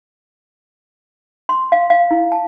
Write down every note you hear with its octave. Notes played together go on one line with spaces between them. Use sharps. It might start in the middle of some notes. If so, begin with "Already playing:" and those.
C6
F5
F5
E4
A5